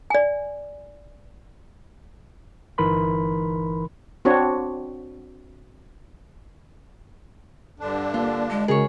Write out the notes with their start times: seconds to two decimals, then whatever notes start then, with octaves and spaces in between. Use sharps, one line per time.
0.10 D5 G#5
2.78 G1 E3 D#4 A#4 B5 C6
4.25 C4 D4 F#4 C#5
7.80 G2 D3 D4
8.14 A#3 F4
8.51 G#3
8.68 C#3 F#4 G#4 A#4 C#5